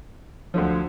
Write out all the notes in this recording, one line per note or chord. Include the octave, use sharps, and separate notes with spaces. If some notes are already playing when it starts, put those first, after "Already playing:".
D2 D3 F3